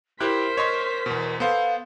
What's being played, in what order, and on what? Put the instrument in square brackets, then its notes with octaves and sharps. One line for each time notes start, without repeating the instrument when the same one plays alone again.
[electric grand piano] E4 G4 F#6 [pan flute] A#4 [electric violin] C5 B6
[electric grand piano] C#5 D#5 C6
E2 B2
[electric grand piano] B3 A4 C5 [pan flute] F5